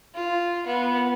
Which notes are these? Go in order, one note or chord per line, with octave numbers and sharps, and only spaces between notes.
F4
B3